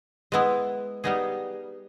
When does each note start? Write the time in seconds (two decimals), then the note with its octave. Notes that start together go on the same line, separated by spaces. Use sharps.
0.32 G#3 B3 E4
1.04 G3 B3 D#4 G#4